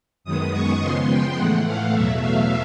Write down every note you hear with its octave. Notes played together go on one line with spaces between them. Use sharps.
F#2 D#3 G#3 B3 D#6
C#6
C#3 F3 G#3 B3 C6
G5
A2 E3 A3 F#5
F5
E2 B2 F#3 A3 E5
F5